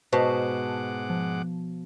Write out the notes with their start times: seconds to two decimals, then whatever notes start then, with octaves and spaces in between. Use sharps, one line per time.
0.13 G#2 B2 B4 C5 F#5 A5 D6
1.10 F3